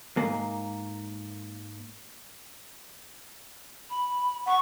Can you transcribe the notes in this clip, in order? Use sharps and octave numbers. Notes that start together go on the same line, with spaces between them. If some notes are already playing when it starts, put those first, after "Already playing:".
G#2 A#3
B5
F#5 C#6